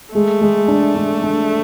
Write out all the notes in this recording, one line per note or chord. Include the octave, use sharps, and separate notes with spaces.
G#3 A3
G#3
D4
D4
D4